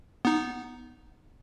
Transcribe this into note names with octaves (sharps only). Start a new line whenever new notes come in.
B3 D#4